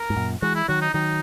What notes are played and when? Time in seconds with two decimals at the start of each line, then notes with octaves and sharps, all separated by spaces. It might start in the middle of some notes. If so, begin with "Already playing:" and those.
Already playing: A#4
0.10 G#2
0.17 F#2 A#2
0.42 E3 G#3 F#4
0.55 E4
0.68 D#3 F#3 F#4
0.81 D#4
0.94 D#3 F#3 D#4